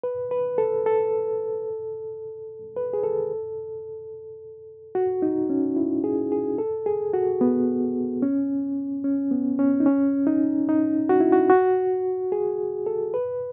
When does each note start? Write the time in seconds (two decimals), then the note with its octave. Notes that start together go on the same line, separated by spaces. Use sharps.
0.04 B4
0.31 B4
0.58 A4
0.86 A4
2.76 B4
2.93 G#4
3.04 A4
4.95 F#4
5.22 D#4
5.50 C#4
5.77 E4
6.04 G#4
6.32 G#4
6.58 A4
6.86 G#4
7.14 F#4
7.41 B3
8.22 C#4
9.04 C#4
9.31 B3
9.59 C#4
9.80 D#4
9.86 C#4
10.27 D#4
10.69 D#4
11.09 F#4
11.20 E4
11.32 F#4
11.50 F#4
12.32 G#4
12.86 A4
13.14 B4